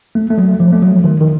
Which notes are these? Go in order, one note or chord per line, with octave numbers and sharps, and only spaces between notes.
A3
A3
F#3
F3
A3
F#3
D#3
D#3